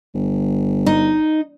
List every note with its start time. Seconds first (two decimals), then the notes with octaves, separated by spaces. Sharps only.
0.14 G1
0.86 D#4